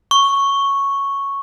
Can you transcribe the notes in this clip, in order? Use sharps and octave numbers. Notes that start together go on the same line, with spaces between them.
C#6